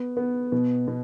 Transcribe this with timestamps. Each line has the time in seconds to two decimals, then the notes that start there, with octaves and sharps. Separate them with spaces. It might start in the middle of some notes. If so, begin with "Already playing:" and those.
Already playing: B3
0.17 B3
0.52 B2
0.88 B2